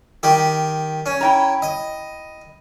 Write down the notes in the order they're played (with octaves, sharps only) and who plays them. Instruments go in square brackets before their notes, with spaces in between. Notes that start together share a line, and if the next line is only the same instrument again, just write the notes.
[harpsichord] D#3 G4
C#4
[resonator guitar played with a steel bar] E4 G5 A#5
[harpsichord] D#5